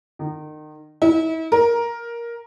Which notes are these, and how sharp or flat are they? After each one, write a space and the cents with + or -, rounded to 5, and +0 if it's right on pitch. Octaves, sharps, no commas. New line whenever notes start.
D#3 -30
E4 -40
A#4 +10